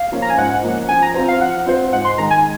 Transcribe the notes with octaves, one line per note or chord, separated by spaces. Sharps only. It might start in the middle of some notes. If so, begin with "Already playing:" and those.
Already playing: F5
F3 A#3 C#4
A#5
G#5
G#2 F#5
F3 A#3 C#4
F3 G#5
A#5
C4 F4 C5 A#5
F5
F3 F#5
C4 F4 C5
G#2 F#5
C6
D#3 G#3 A#5
G#5